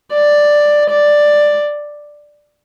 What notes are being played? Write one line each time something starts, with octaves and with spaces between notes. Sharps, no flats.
D5
D5